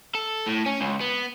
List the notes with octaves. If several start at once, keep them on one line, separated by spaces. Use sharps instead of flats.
A4
A2
C#4
C#2
B3